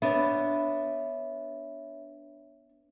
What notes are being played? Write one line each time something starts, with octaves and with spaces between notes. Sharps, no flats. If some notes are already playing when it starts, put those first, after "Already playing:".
B3 D4 C#5 E5